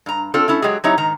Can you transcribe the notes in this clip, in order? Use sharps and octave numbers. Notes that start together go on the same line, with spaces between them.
G2 A#5
C4 D4 F4 A4
A3 C#4 E4
F#3 G#3 G4 G#4
F#3 C4 D#4 E4 G4 C#5
G#2 D#3 A#5